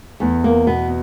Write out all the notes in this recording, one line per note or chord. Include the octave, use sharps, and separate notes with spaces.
E2 A3
A#3
B2 B3